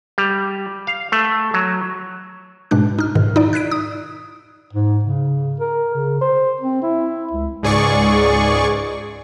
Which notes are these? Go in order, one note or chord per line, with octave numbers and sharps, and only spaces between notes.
G3
F5
A3
F#3
G#2 B2 G#3 D4 F#6
D#4 F6
G#2 B2 D#3
D#4 E4 D5
F#6 G#6 B6 D7
D#6
G#2
C#3
A#4
C#3
C5
C4
E4
C#2
C#2 G#2 G#4 D5 C#6